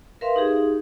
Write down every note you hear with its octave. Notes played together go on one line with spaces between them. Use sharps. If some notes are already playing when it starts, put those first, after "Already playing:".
A#4 B4 E5 F5 C6
D#4 G4 G#4